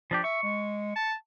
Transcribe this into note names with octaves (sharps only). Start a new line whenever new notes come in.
F3 D4 G4
E5 C#6
G#3
A5